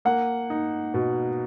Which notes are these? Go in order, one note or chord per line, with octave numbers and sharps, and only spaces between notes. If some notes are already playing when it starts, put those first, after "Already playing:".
A#3 F#5
D#4
B2